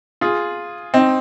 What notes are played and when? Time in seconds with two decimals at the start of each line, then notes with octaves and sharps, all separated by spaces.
0.21 F4 G#4
0.94 C4 D#4